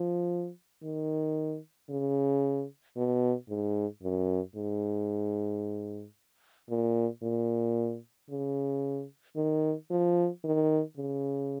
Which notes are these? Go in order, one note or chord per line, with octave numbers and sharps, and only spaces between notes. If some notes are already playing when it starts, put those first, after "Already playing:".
Already playing: F3
D#3
C#3
B2
G#2
F#2
G#2
A#2
A#2
C#3
D#3
F3
D#3
C#3